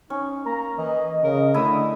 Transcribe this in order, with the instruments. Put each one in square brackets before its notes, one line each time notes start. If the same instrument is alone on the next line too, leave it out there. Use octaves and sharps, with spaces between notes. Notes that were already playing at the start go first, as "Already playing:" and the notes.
[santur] C#4 [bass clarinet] D#4
[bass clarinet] A#3 [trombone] A#4 [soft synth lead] A#5
[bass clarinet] E3 [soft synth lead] D#5
[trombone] C#3 [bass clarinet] A#4
[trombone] D3 [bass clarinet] A3 [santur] E4 D#6